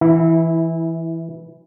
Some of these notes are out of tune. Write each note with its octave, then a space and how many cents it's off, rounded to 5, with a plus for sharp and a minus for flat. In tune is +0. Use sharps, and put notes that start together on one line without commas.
E3 +0 E4 -20